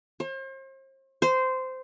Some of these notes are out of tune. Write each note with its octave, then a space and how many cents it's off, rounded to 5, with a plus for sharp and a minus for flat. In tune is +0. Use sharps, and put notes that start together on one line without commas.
C5 +40
C5 -15